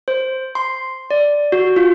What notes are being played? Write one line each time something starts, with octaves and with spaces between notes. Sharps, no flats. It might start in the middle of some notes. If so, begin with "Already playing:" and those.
C5
C6
D5
F#4
F4